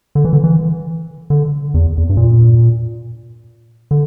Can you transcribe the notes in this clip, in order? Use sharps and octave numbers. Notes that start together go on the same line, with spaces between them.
D3
E3
D3
E3
D3
E2
E2
G2
A#2
D3